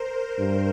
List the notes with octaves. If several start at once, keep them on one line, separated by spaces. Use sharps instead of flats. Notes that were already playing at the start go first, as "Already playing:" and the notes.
Already playing: A#4 C5
G2